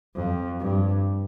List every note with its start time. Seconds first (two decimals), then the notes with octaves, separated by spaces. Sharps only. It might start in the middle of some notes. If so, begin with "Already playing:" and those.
0.15 F2
0.59 G2